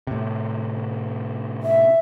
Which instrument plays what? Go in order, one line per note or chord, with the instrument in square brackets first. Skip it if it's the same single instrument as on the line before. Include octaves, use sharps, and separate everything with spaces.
[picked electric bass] A2 C3
[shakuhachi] E5